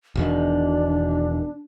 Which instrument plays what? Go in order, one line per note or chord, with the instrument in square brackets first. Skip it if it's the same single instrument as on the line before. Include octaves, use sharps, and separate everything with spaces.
[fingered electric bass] E1 B2 D#3 [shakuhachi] D4